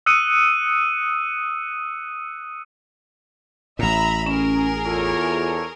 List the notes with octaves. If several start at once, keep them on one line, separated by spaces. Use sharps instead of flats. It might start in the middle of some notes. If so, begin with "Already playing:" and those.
D#6 E6 F#6 C#7 D#7
A1 A2 E5 A#5 B5
C#4 G#4 A#4
E2 F4 A4 C#5